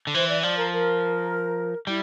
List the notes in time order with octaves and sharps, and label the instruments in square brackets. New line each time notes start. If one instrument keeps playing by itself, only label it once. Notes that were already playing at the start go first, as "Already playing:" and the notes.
[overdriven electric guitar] D3
[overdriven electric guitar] E3 [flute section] C5
[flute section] D5
[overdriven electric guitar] F3 [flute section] D5
[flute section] A#4
A#4
[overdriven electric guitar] G3 [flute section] E4